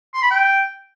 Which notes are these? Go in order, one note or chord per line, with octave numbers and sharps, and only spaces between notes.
C6
B5
G5